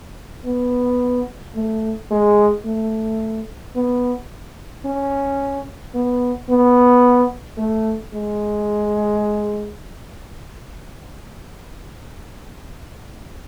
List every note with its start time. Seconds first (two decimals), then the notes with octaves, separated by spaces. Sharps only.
0.46 B3
1.55 A3
2.11 G#3
2.65 A3
3.76 B3
4.85 C#4
5.95 B3
6.49 B3
7.58 A3
8.14 G#3